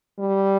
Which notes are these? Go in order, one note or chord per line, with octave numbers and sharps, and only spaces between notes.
G3